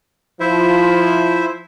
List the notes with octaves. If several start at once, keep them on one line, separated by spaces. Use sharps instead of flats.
F3 E4 C5 E5